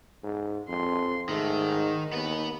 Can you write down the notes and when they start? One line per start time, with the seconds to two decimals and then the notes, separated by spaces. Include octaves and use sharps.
0.24 G#2
0.68 F2 C6
1.29 G#2 D#3 A3
1.65 D#4
2.12 D#2 B3 B4